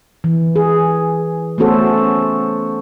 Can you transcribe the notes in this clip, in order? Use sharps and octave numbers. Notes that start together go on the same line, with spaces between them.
E3
G#4
A3 B3 C#4 F#4 A4 C5